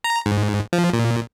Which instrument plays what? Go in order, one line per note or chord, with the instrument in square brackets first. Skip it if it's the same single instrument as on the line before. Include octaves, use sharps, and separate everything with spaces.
[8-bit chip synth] A#5
G#2
F3
A#2